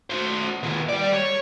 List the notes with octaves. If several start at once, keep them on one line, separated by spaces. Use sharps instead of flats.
F#4 C5
D#2 G#4
G3 D5
C#5